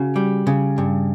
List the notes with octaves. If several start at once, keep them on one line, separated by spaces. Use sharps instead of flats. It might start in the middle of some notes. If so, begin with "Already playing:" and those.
Already playing: C#3 F#4
G3
C#3
G2